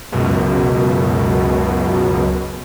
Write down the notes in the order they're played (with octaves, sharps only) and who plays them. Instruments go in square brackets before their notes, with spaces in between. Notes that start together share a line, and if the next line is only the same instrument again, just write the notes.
[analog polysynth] C#2 F#2 B2